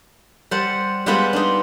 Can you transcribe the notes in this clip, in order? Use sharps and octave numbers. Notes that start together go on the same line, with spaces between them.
G3 C5 F#5 A5
G3 G#3 B3 F4 B4 F#5
D4 D#4